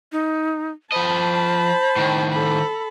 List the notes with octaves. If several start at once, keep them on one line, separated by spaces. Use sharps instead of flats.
D#4
F3 C5 D#5 A5 B5
A2 D#3
A4 B5